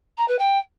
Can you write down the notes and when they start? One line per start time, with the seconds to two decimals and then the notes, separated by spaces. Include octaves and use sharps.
0.17 A#5
0.28 B4
0.39 G5